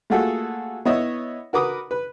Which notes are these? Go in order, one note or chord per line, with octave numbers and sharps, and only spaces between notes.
A3 A#3 F4 F#4 G#4 A4
B3 E4 C#5 D#5 E5
F#4 A#4 B4 D6 D#6
B4